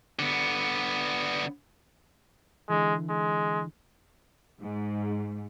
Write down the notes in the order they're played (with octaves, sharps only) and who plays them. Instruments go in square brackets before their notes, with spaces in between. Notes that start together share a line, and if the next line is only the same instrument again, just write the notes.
[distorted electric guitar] D3 B3
[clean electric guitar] D3 E3 [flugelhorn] G#3
[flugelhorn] G#3
[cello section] G#2